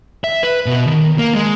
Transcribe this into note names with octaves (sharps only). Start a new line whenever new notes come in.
E5
B4
B2
D#3
A#3
G#3